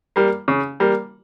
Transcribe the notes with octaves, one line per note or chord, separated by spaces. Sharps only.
G3 A#3
C#3
G3 A#3